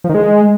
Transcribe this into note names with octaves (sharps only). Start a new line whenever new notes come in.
F3
D#3
G#3